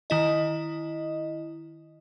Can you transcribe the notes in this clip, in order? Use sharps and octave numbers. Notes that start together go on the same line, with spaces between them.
D#3 E4 D#5